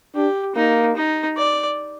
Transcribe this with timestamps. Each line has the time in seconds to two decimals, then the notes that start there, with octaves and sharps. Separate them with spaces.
0.15 D4 G4
0.56 A#3 D#4
0.96 D#4
1.37 D5